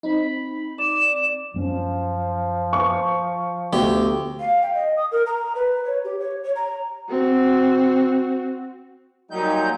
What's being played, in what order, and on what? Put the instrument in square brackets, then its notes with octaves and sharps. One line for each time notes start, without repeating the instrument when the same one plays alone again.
[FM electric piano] C4 D#4 [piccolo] B5
[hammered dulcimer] D5 [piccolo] E7
[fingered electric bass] F#2 B3 C#4 [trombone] F3
[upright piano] C#6
[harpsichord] D2 G4 [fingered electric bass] B3
[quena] F5
G5
D#5
D#6
A#4
A#5
B4
C#5
G4
C#5
C#5
A#5
[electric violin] C4 F#4
[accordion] A#2 F#3 G6 [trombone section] G3 D#4